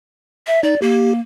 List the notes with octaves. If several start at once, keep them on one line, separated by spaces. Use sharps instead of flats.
E5
D#4 D5
A#3 G4